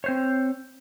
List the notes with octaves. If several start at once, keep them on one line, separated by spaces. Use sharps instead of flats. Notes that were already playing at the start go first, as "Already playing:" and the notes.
C4 C5 C#5